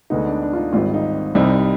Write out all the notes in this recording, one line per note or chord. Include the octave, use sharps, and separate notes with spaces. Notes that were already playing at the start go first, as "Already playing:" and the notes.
D2 D3 G#3 B3 D#4
D4
D4
F4
D#4
G#1 G#2 D#3 G3 C4 F4
D#4
C2 C3 G3 C4 D#4